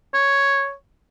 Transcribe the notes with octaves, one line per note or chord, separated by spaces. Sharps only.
C#5